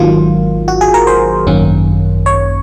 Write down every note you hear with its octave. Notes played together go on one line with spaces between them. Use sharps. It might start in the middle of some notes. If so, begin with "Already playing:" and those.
Already playing: G#1 G#2 D#3 F#3 A#3 F4
F#4
G#4
A#4
C5
G#1 F#2 D#3 A#3 C#4
C#5